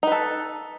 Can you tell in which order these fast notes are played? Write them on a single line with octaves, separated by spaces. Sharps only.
D#4 B4 A4